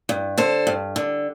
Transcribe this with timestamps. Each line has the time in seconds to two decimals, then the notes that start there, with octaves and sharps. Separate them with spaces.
0.09 G2
0.38 D3 A4 C5
0.67 G2
0.96 D3